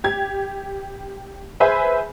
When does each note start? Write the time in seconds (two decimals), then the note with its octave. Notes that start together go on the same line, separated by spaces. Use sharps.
0.04 G4 G#6
1.60 G#4 B4 C5 E5 G#5 B5